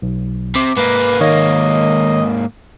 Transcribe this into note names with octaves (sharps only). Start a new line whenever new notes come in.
B1
C3 D6
G#2 A#3 B4
D#3 C#5 D#5 F5